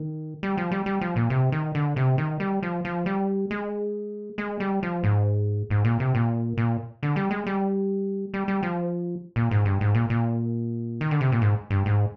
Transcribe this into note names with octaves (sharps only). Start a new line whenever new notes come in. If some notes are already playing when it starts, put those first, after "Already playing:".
Already playing: D#3
G3
F3
G3
G3
F3
A#2
C3
D#3
D3
C3
D#3
G3
F3
F3
G3
G#3
G#3
G3
F3
G#2
G#2
A#2
C3
A#2
A#2
D3
G3
G#3
G3
G3
G3
F3
A#2
G#2
G2
G#2
A#2
A#2
D#3
D3
C3
A#2
G#2
G2
G#2